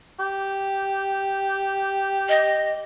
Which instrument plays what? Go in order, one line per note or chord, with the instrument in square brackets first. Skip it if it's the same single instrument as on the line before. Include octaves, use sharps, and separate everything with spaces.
[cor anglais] G4
[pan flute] D#5